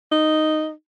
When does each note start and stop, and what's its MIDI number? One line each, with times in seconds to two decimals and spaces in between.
0.12 0.71 63